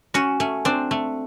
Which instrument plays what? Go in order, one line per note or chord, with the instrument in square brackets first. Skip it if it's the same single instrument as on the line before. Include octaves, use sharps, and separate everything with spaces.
[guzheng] C#4 [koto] F#4
[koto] A3 [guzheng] C#4
[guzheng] C4 [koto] D4
[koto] A3